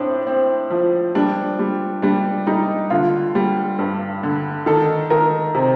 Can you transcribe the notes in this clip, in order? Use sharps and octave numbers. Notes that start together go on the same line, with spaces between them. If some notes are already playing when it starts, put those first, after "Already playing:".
Already playing: A2 C4 D4
C4
F3
G3 D4
G3
G3 D4
G3 D#4
D3 F4
G3
G2
D3
D#3 A4
D#3 A#4
C3